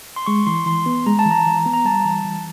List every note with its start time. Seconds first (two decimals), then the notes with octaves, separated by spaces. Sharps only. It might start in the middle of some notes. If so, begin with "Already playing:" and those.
0.16 C6
0.26 G#3 C#6
0.47 E3 C6
0.66 E3 C6
0.86 B3
1.06 G#3 A#5
1.19 A5
1.26 E3
1.31 A#5
1.46 E3
1.66 B3
1.74 A#5
1.85 G3 A5
2.05 E3
2.25 E3